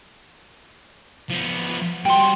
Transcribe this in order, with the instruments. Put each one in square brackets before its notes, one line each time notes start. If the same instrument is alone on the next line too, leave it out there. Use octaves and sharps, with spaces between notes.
[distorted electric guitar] F3 B3
[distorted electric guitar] G3 F#4 [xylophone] G5 C6